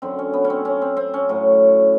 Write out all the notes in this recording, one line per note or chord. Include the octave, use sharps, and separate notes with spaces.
F#2 D3 F#3 C4
C#4
B3
C#4
C4
C#4
C4
C4
C#4
A2 F#3